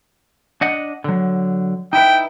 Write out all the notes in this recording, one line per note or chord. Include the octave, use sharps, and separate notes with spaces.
D4 D#5 F#5
D3 F#3
D#4 E4 B4 G5